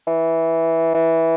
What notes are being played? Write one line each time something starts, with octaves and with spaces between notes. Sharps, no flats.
E3
E3